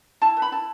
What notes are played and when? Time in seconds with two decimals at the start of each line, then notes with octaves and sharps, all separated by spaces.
0.22 E4 A5
0.37 B4
0.42 B5
0.52 E4 A5